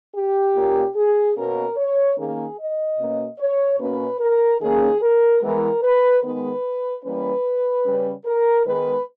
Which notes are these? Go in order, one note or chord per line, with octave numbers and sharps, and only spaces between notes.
G4
A#2 A#3 C#4
G#4
B2 A#3 C#4 A#4
C#5
D#3 A#3 C#4 G#4
D#5
B2 A#3 C#4
C#5
B2 A#3 C#4 B4
A#4
D#3 A#3 C#4 G#4
A#4
E3 G#3 B3 A#4
B4
D#3 G#3 B3 B4
E3 G3 A#3 C#4 B4
C#3 G3 C#4
A#4
D#3 G#3 B3 B4